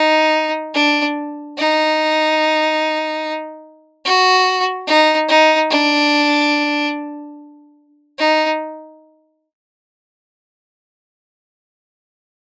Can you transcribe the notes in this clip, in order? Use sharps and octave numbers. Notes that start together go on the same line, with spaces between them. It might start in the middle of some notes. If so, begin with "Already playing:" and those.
Already playing: D#4
D4
D#4
F#4
D#4
D#4
D4
D#4